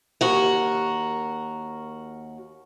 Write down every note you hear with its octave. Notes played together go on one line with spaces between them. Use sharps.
D#2 F#4 A#4